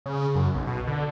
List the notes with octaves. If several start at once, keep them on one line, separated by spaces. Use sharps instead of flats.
C#3
F#2
B1
B2
D3